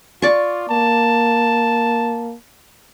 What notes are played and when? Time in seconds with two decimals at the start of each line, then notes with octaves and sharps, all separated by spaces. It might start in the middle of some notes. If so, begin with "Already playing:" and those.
0.22 F4 D5 C#6
0.69 A#3 A5